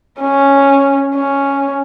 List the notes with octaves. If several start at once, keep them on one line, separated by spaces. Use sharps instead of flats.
C#4
C#4